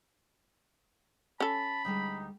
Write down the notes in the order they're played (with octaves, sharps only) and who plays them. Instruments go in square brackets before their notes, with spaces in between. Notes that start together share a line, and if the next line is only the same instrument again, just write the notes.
[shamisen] C#4 A4 [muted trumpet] A5 [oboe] B5
[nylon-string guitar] D2 G3 G#3 [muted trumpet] D#4